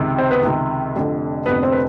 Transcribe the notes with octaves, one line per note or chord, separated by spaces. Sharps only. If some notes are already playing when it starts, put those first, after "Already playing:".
Already playing: C#2 C3 D#3
C4 C5
B3 B4
C#2 C3 D#3
F1 F2 D3
F1 F2 D3 B3 B4
C4 C5
B4